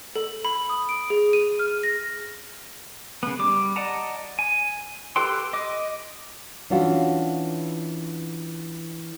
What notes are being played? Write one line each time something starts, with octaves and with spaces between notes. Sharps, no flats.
A4
B5
D#6
D7
G#4
D#7
F6
A#6
C#3 B3
G3 D6
D5 D#5 F#5 A5 A#5
G#5
G4 A4 B4 G5 C6
D#5 D6
E3 C#4 D4 F4 F#4